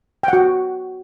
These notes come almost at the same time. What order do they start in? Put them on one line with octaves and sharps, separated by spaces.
G5 F#5 F#4